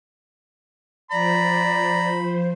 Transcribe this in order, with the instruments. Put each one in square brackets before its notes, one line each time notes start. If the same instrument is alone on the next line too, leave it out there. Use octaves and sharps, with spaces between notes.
[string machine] F3 C5 [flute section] D5 [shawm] A#5 [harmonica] B5